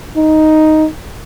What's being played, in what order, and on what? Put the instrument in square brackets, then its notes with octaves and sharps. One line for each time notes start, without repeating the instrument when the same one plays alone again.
[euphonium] D#4